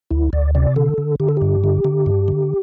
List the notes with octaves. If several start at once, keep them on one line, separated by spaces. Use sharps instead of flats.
D2 E4
D2 D5
C3 D5
D3 A4
D3
D3 G4
A4
G2 G4
D3
D3
G2
D3